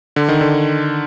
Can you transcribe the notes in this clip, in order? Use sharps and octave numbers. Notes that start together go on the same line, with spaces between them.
D3
D#3
D3